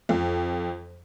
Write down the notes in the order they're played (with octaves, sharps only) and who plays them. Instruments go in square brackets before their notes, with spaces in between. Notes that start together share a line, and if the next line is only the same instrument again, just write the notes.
[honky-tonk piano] F2